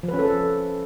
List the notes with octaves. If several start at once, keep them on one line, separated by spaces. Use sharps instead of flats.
F3
B4
C#4
A4